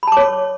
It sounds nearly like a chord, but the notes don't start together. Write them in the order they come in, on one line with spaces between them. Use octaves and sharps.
B5 A5 D6 C#5